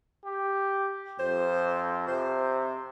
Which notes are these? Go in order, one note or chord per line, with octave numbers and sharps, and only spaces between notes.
G4
F2 C5
C3 C5